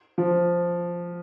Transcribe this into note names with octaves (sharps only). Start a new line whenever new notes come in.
F3